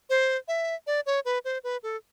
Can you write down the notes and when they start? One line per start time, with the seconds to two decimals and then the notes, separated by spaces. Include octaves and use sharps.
0.10 C5
0.48 E5
0.87 D5
1.06 C#5
1.25 B4
1.45 C5
1.64 B4
1.83 A4